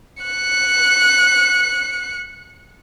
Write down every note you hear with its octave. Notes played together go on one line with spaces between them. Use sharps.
F#6 C#7